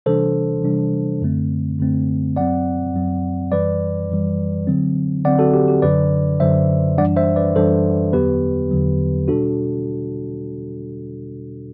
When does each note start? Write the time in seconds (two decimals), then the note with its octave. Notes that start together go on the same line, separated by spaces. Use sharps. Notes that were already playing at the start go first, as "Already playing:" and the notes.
0.06 C3 E3 G3 D4 A4 C5
0.64 C3 E3 G3 D4
1.22 F#2 D3 A3 C4
1.79 F#2 D3 A3 C4
2.36 F#2 F#3 C4 D5 F#5
2.94 F#2 F#3 C4
3.52 F#2 E3 G3 B4 D5
4.10 F#2 E3 G3
4.67 D3 F#3 C4
5.25 D3 F#3 C4 D5 F#5
5.39 F#4 A4
5.54 G4
5.68 G4
5.82 F#2 D3 F#3 B4 D5
6.40 F#2 D3 F#3 C5 E5
6.98 F#2 E3 G3 D4 D5 F#5
7.17 C5 E5
7.36 B4 D5
7.56 F#2 E3 G3 D4 A4 C5
8.13 E2 D3 F#3 B3 G4 B4
8.70 E2 D3 F#3 B3
9.28 B2 G3 D4 F#4 A4